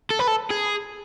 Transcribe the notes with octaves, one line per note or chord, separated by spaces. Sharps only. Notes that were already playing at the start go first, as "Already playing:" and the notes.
A4
B4
A4
G#4